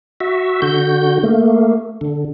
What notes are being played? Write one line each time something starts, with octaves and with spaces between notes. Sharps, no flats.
F#4 E5
D3 F#4 G6
A3 A#3
D3